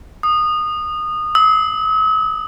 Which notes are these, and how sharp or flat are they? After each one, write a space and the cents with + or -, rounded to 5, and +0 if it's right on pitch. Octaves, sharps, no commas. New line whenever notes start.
D#6 -20
E6 -45